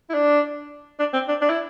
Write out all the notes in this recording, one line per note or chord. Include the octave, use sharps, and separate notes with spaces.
E4
D4
D4
C4
D4
D4
E4